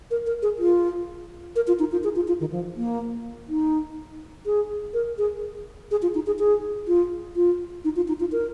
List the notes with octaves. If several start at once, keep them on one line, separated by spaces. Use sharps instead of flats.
A#4
A#4
G#4
F4
A#4
F4
D#4
F4
G#4
F4
F4
D#3
F3
A#3
D#4
G#4
A#4
G#4
G#4
F4
D#4
G#4
G#4
F4
F4
D#4
F4
D#4
F4
A#4